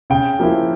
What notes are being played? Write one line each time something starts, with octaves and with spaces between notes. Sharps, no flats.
C#3 G5
F3 A#3 E4